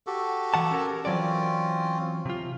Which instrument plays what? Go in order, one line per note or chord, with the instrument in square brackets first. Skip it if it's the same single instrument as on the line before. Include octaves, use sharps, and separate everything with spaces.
[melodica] F#4 G4 A4
[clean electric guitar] E3 F#5 A5
C#4 A#4
[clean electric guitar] E3 F#3 D5 [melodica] C4 C#4 F4
[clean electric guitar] C3 F4